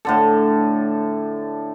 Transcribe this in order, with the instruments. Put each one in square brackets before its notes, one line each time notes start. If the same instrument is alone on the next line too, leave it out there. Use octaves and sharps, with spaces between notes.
[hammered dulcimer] A2 D3 A4